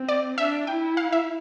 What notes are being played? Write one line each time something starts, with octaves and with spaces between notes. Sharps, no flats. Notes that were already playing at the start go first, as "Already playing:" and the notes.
Already playing: C4
D5
D4 E5
E4 G5
F5
E5